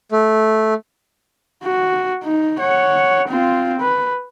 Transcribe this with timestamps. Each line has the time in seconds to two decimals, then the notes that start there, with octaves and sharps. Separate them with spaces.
0.12 A3
1.64 F#4
2.23 D#4
2.60 C#5 F#5
3.28 C4 F4
3.81 B4